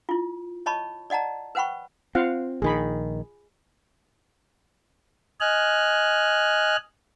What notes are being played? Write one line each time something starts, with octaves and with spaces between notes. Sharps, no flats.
E4 F4
C#5 D#5 A5 B5 C#6
D5 D#5 F#5 A5 A#5
B4 C5 F#5 G5 B5 C#6
C4 F4 F5 F#5
A#1 D#3 G#4 B5
D#5 G#5 F6 F#6